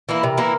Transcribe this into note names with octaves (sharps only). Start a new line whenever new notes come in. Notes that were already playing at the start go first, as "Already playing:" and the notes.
E3 A#3 E4
C3 A#4
E3 A#3 E4